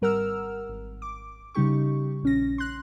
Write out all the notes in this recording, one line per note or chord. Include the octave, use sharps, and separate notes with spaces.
G#1 G3 A#4 F#5 E6 F6
G#1
D6
C#3 G3 D#4 G4 C#6
A#1 C#4 A#6
C6 F#6